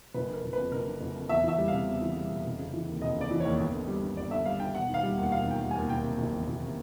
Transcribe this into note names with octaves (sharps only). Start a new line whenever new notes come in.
F#1 B4
D3 A#4
F#1
F2 B4
F#1 A#4
D3
F#1
F2
E2 E5
E3 E5
G3
C3 F5
E2
E3
G3
C3
F1
C#3
E3
D#2
F1 D#5
C#3 D5
E3
D#2 C#5
G1
D3
G3
G2
G1 D5
D3 E5
G3 F5
G2 G5
E1 F#5
D#3
F5
G3
D#2
F#5
E1 F5
D#3 G5
G3
D#2 G#5
F#1 G5
C3
F#1
E2
F#1
C3